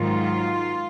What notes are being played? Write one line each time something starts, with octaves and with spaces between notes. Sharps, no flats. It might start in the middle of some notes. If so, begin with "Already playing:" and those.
Already playing: G#2 D#3 F#3 F4